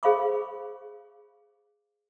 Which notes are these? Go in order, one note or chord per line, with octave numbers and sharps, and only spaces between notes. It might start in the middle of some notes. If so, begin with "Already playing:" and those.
G#4 C5 F5 B5 C#6 D6